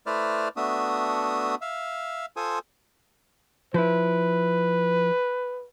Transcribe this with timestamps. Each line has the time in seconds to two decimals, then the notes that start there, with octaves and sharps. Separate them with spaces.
0.06 A3 E4 B4 C5 D5 F6
0.57 A3 B3 D4 F#4 E5 D#6
1.61 E5 F5
2.37 F4 A4 C5 G#5 D#6
3.74 F3 E4 B4